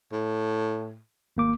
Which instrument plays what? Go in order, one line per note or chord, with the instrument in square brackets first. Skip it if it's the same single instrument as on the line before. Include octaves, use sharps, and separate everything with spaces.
[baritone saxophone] A2
[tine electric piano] G#1 A#3 D6